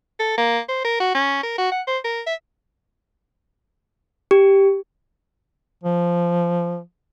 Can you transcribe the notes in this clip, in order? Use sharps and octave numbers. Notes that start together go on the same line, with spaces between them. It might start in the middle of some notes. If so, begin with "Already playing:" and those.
A4
A#3
C5
A#4
F#4
C#4
A#4
F#4
F#5
C5
A#4
E5
G4
F3